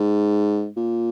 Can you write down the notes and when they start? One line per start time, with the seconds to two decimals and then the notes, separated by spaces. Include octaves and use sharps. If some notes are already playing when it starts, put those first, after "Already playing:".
Already playing: G#2
0.77 A#2